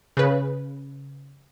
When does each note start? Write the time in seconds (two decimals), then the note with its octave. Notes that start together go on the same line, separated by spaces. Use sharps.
0.17 C#3 B4